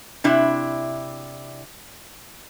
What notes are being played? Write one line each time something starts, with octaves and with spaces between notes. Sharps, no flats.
C3 D4 E4